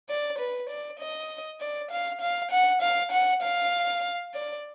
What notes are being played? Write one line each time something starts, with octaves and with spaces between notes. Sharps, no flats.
D5
B4
D5
D#5
D5
F5
F5
F#5
F5
F#5
F5
D5